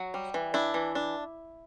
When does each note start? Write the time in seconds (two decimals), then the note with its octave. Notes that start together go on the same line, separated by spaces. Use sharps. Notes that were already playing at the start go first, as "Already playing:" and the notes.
Already playing: F#3 F#4
0.14 G3
0.34 E3
0.54 D4 E4
0.74 E3
0.95 D4